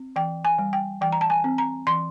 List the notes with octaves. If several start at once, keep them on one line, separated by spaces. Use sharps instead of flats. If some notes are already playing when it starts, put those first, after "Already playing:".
Already playing: C4
E3 G5
G#5
G3
G5
E3 G5
A#5
A5
G#5
C4
A#5
E3 C6